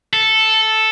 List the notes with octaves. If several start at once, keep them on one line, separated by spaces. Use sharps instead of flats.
A4